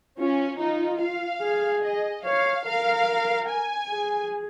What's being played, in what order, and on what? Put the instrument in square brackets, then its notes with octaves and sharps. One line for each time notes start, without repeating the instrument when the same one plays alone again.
[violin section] C#4 [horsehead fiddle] F4
[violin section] D#4 [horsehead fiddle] F4
[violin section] F5
[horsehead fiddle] G#4
[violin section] D#5
[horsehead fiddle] C#5 [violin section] F5
[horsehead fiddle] A#4 [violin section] F5
[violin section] G#5
[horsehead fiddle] G#4